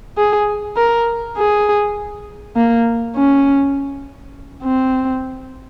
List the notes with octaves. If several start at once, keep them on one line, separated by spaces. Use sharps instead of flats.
G#4
A#4
G#4
A#3
C#4
C4